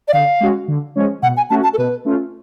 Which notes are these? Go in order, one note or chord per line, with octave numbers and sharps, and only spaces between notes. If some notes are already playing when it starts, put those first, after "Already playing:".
D5
D3 F5
G#3 C#4 F#4
D3
F3 G#3 C#4
B2 F#5
G#5
A3 C#4 F#4 A5
A5
A4
B2 B4
A3 C#4 F4